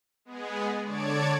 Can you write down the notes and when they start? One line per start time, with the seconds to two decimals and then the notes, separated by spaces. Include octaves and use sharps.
0.25 G#3 B3 G#4
0.82 D3 C#5 D5 A5 G#6 D7